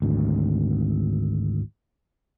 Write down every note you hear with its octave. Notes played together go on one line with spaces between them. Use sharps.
G#1 D2